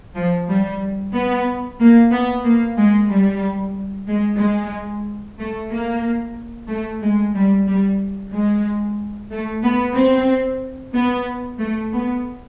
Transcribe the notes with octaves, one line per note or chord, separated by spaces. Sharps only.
F3
G3
B3
A#3
B3
A#3
G#3
G3
G#3
G#3
A3
A#3
A3
G#3
G3
G3
G#3
A3
B3
C4
B3
A3
B3